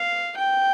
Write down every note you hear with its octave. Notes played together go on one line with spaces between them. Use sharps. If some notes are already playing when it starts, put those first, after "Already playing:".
Already playing: F5
G5